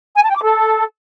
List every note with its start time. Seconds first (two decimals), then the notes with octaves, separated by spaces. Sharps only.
0.16 G#5
0.23 A5
0.30 G5
0.36 D6
0.43 A4